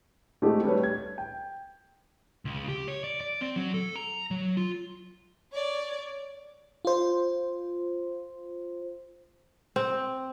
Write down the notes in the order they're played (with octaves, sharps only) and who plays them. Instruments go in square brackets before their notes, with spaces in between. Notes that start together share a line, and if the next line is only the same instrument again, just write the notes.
[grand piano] G#3 A3 C4 F#4 G4
G3 A3 B4 C#5
G#6
G5
[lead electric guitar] C#2
G4
C#5
D5
D5
C4
F#3
A4
A#5
F#3
F4
[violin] C#5 D5
[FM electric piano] F4 C5
[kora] C4